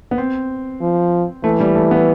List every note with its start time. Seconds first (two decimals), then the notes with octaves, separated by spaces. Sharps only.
0.11 B3
0.18 C4
0.81 F3
1.44 E3 A3
1.60 G3
1.75 A3
1.91 B3